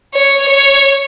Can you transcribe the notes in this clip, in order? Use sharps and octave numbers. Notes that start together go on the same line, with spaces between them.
C#5
C#5